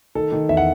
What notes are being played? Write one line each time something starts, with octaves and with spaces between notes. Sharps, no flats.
D#3 A4
D#3
E2 E5
F#5